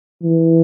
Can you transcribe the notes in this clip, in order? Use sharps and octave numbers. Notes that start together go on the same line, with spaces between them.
E3